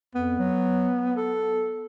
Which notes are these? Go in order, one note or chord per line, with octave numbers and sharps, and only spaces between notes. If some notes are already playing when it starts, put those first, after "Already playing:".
F2 B3
F#3
A4